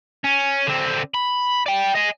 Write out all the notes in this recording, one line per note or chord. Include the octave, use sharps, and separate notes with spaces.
C#4
D3 C4
B5
D5 G5
D#5 G#5